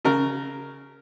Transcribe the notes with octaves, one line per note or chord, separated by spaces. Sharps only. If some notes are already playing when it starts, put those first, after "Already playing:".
C#3 A#4